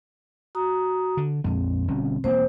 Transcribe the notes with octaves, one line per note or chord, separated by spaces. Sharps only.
F#4 A#5 D#6
D3
A#1 F2 G#3 C4
G1 B2 C#4
E1 A#3 C4 C5